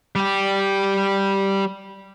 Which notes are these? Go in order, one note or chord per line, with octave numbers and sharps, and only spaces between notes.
G3 G4